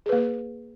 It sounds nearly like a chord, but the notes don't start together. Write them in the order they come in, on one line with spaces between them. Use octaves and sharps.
G#4 B4 A#3